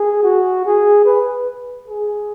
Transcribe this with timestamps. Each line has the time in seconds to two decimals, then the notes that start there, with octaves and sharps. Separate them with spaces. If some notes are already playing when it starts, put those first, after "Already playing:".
Already playing: G#4
0.23 F#4
0.65 G#4
1.05 B4
1.88 G#4